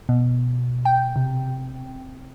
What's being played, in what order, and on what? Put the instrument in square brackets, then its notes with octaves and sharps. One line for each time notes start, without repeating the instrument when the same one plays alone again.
[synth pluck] B2
G5
C3